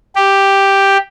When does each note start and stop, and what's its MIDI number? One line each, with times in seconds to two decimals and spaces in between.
0.16 0.98 67